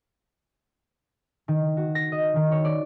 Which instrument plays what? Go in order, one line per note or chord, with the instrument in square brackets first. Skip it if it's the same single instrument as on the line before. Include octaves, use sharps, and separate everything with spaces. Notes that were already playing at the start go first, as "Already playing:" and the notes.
[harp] D#3
F#4
A#6
D#5
D#3
C#5
D5